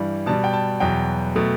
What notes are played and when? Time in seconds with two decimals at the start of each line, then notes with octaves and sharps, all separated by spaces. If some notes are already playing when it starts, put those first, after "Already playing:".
Already playing: G2 E3 G3
0.26 B2 G3 A5
0.44 G5
0.53 A5
0.80 E2 B2 F#3 G5
1.36 B2 F#3 A3